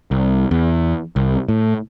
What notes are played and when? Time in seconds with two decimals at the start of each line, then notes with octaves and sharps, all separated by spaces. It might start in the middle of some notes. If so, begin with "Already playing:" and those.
0.11 C2
0.51 E2
1.16 C2
1.48 A2